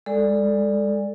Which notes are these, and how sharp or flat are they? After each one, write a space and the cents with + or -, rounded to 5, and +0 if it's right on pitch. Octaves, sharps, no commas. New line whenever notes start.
G#3 -25 A4 +0 D5 +0